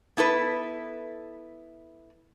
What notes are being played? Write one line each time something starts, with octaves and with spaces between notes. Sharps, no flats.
B3 E4 A4 B4